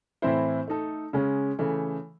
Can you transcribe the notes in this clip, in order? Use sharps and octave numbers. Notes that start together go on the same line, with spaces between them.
A2 E3 C4 E4 C5
A3 D#4 A4
C#3 G#3 C#4
C#3 E3 A3